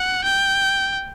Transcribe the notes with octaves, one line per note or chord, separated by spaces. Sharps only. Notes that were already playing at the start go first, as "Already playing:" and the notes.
Already playing: F#5
G5